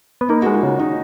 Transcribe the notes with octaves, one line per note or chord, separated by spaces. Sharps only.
B3
A#3 D#4
F#4
G#3
F4
C#3
D#3 D#4